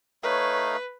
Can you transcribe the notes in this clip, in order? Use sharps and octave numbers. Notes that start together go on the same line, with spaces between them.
A3 D#4 B4 C#5 F5